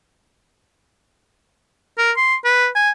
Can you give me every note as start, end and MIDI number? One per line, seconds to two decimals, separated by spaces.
1.98 2.12 70
2.17 2.35 84
2.44 2.68 71
2.76 2.91 80